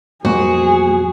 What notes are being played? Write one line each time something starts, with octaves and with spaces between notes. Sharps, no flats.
B1 F2 G3 A#3 F#4 G#4 C5